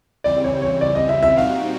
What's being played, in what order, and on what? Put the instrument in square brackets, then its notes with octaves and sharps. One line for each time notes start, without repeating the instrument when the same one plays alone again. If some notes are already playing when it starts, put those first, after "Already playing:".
[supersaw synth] C#3 E3 G3 C4 [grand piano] D5
[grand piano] C#5
C#5
D5
D#5
E5
E5
[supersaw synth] A#2 G3 C4 D#4 F#4 [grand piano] F5